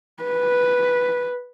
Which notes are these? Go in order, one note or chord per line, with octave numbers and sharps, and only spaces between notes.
B4